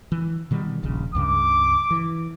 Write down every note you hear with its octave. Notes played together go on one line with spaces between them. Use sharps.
E3
B2 D#3 G3
D#1 A#1 C#3
C#2 G2 C#3 D6
E3